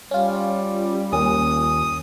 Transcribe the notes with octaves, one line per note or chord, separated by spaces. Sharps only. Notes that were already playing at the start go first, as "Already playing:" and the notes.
G3 C#4 F4
D#2 G#5 D#6